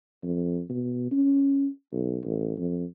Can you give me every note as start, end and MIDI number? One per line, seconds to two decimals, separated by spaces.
0.23 0.62 41
0.70 1.08 47
1.11 1.68 61
1.92 2.19 35
2.24 2.53 33
2.58 2.85 41